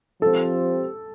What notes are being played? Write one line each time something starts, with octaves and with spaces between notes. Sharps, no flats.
F3 C4 G4 A4 C5